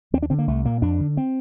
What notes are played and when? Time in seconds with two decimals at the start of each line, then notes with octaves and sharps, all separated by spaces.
0.13 D#2 C4
0.23 D4
0.30 D3 C4
0.39 A#3
0.48 C2 A3
0.65 A#2 A#3
0.82 F2 D4
1.00 D3
1.17 C4